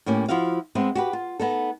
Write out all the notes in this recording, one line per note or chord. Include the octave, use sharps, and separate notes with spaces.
A2 A#3 C#4 G4
F3 E4 F#4 F5
G#3 B3 C4 E5
F#4 G4 B4
F4
B3 D#4 A4